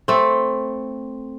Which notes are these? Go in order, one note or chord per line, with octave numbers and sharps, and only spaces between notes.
A3 C4